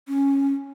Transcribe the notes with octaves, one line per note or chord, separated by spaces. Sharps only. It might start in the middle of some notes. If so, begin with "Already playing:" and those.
C#4